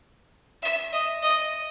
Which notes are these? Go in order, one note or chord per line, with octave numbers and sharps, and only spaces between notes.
E5
D#5
D#5